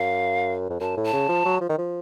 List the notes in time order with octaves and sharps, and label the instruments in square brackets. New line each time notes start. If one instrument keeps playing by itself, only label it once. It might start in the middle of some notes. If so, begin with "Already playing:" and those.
Already playing: [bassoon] F#2 [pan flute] F5
[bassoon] F2
[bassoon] F#2 [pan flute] A5
[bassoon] A2
[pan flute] A5
[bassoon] C#3
F3
F#3
F3
D#3
F3